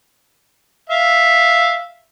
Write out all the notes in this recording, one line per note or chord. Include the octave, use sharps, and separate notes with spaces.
E5 F5